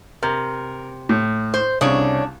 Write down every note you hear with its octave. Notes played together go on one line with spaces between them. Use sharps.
C3 A#4
A2
C5
C2 C#3 D4 C#5 D#6